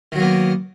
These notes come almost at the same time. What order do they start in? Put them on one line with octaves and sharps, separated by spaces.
D#3 F#3 A#3 B3